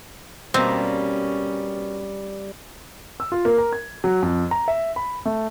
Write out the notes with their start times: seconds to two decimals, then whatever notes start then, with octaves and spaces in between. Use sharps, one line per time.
0.54 B2 G3 A#3 C4 C#4
3.20 E6
3.32 F4
3.45 A#3
3.58 A#4
3.73 G#6
4.04 F#3
4.22 F2
4.51 A#5
4.68 E5
4.96 B5
5.26 A3